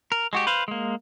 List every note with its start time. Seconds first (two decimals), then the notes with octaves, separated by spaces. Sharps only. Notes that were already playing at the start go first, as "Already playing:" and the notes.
0.12 A#4
0.33 G#3 F#4 G4
0.47 B4 C5 F5
0.68 G#3 A#3